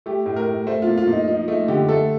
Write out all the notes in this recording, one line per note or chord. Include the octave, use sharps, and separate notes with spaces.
A3 G4
A2
A#4
A2
A3 C5
F4
A#2
F4
A#2 D#4
F3 D#4
A3 D#4
D3 G4
A3 A4